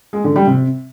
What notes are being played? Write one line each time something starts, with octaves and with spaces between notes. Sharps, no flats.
G#3
D3
G3
C3